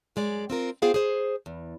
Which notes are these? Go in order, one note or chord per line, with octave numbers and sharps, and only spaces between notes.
F#2 G#3 D5
C4 F4 A#4
B3 F4 G#4 C5 F5 G5
G#4 C5
E2